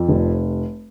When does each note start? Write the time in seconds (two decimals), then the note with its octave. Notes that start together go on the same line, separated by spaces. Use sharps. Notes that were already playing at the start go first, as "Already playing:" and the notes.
Already playing: F2
0.08 F1